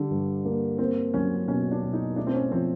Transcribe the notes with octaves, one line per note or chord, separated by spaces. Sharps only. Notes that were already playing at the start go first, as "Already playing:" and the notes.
Already playing: D3 G3
G2
A#3
A#3 C4
F#3 C#4
B2 C#4
D4
B2
D#4
A3 D4
C4
C#4
F3 C4